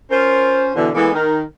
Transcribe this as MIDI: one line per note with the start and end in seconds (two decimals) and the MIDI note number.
0.11 0.69 61
0.11 0.69 65
0.11 0.69 70
0.11 0.69 72
0.76 0.89 47
0.76 0.89 50
0.76 0.89 52
0.94 1.12 52
0.94 1.12 56
0.94 1.12 58
0.94 1.12 59
0.94 1.12 69
0.94 1.12 71
1.13 1.41 51
1.13 1.41 70